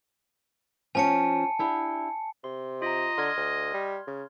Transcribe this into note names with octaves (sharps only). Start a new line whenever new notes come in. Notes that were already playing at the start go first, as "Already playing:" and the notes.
F3 C#4 G#5 A5 C#7
D4 E4 G4
C3 C6
F4 D#5 A#5
D3 C6 F6 G#6
D2
G3
C#3